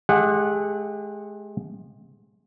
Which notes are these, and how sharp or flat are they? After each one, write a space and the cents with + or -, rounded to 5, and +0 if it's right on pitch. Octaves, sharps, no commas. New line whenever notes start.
G#3 +35 G4 +45 F#5 -10